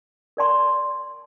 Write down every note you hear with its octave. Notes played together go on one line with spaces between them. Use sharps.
A#4 D5 A5 C6